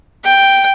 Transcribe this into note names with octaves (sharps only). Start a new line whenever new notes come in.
G5